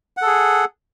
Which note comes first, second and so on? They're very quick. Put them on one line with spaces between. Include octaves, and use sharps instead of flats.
F#5 A4 G#4